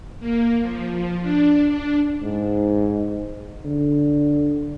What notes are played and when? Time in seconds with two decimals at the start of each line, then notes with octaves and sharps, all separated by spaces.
0.20 A#3
0.61 F3
1.22 D4
1.69 D4
2.22 G#2
3.65 D3